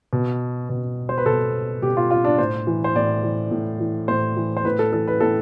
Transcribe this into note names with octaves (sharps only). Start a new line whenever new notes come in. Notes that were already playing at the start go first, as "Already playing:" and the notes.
B2
B2
C5
B4
B2 A4
B2 G4
F4
F4
D4
A2 C5
E3
C5
A2 D5
E3
A2
E3
A2 C5
E3
C5
A2 B4
A4
E3 A4
B4
A2 A4